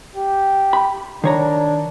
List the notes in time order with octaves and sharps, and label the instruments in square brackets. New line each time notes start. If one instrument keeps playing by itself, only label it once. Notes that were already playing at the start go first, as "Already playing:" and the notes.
[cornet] G4
[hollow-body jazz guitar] B5
[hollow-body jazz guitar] D#3 C#5 A#5 [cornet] D4